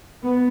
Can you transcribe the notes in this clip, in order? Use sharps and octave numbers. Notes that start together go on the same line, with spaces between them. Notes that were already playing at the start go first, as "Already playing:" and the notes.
B3